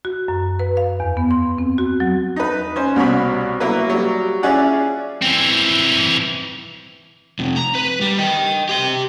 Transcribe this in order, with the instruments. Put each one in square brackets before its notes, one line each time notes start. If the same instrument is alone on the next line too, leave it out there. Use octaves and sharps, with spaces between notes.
[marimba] F#4
F#2
B4
F5
E2
B3
C6
C4
F#4
F#3
[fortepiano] D#4 B4
C#4 C5
C2 B2 C#5 B5
F#3 A#3 E4 B4
F#3 G3
C#4 E4 F4 G#4 D5 F#5
[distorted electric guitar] E3 C4
[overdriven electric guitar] F2 C3
A#5
B4
G3
D#5 G5
G4 C6